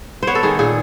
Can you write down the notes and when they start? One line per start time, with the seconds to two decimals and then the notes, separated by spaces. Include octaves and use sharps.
0.23 B3 C5 C#5
0.35 A4
0.43 D#3 G#4
0.59 A#2 G#4